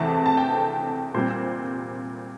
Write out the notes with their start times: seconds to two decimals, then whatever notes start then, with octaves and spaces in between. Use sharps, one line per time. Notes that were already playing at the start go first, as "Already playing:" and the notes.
Already playing: E2 C3 E3 A3 C4 A5
0.15 A5
0.26 A5
0.37 G5
1.14 A#2 G3 C4 C5